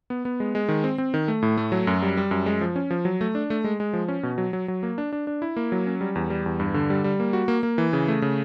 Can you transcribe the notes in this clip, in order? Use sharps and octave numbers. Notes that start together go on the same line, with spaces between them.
B3
B3
G#3
G#3
D#3
C4
C4
D#3
A3
A2
A3
F#3
F#2
G3
G3
F#2
G#3
F3
C#4
F3
F#3
A3
D4
A3
G#3
G#3
F3
C#4
B2
F#3
F#3
F#3
A#3
D4
D4
D4
E4
A#3
F#3
C#4
G3
E2
G3
E2
G2
D3
G3
G3
A#3
F#4
A#3
A#3
E3
C#3
A3
C#3